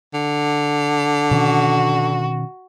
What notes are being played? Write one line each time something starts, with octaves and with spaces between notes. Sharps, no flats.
D3
B2 D#3 C#4 F#4